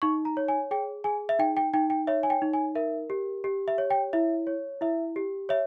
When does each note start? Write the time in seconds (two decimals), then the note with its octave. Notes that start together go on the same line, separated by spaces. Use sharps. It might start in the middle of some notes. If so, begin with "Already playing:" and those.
0.02 D#4 C#6
0.25 A#5
0.37 C#5
0.48 G#5
0.71 G#4 G5
1.04 G#4 G#5
1.29 E5
1.39 D#4 G5
1.57 G5
1.73 D#4 G5
1.90 G5
2.07 C#5 E5
2.23 G#5
2.30 G5
2.42 D#4
2.53 G#5
2.75 A#4 E5
3.10 G4
3.44 G4
3.68 E5
3.78 C#5
3.90 G5
4.13 E4 E5
4.47 C#5
4.81 E4 E5
5.16 G4
5.49 C#5 E5